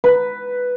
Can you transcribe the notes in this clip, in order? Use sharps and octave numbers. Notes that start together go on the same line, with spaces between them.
B4